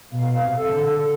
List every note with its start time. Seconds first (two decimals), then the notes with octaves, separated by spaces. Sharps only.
0.12 B2 F5
0.41 C3
0.56 A4
0.70 D3
0.98 A4